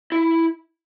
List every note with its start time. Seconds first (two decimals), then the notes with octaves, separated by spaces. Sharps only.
0.12 E4